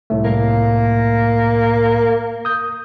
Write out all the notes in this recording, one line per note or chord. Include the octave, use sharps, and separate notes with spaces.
C2 A2 A3
A#3
D#6 G6